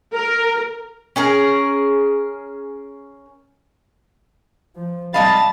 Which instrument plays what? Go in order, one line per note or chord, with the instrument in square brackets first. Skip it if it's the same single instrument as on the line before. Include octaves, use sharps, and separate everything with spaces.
[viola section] A#4
[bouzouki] C#4 G#4 A#4
[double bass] F3
[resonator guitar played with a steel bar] C3 D#5 F5 [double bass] G3 [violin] A5 A6 [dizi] B5